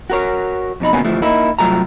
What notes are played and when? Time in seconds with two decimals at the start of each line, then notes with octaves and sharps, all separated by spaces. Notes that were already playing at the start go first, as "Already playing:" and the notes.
0.10 F#4 A#4 C#5
0.80 F2 B2 D#4 B5
0.93 D2 B2 A#3 B3 C#4
1.05 D2 E3 F3 A3
1.22 A#3 D#4 E4
1.59 C2 F#3 A3 F4 A#5